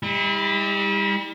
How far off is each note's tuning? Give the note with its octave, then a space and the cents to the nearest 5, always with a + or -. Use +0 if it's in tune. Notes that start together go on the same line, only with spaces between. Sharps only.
G3 +35 E4 -35